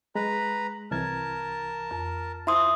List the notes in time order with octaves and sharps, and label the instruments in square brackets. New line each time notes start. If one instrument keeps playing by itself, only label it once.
[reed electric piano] G#3 [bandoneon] B4 A#5 B5
[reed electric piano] C2 E3 G#6 [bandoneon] A#4 A5
[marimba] F2
[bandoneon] F3 [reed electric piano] E4 [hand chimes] E5 C6 D#6